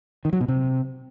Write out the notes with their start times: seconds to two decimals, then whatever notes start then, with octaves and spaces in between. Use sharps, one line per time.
0.25 D#3
0.33 F#3
0.41 B2
0.48 C3